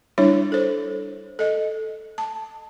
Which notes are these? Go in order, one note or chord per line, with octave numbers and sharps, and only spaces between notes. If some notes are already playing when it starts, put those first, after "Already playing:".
G3 D4 E4 C#5
A4 C5
A4 D#5
A5